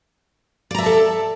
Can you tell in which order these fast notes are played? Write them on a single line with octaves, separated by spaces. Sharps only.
D5 A#5 E5 A5 A4